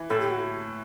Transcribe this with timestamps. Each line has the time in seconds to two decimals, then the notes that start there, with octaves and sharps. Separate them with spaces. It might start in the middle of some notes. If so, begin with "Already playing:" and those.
Already playing: E3
0.09 A2 A4
0.20 G4
0.30 F#4